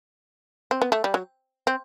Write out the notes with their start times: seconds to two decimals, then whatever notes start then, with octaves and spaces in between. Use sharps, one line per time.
0.71 C4
0.82 B3
0.92 A3
1.04 G3
1.14 F#3
1.67 C4